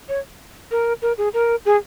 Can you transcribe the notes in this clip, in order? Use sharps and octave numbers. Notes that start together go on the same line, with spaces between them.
C#5
A#4
A#4
G#4
A#4
G#4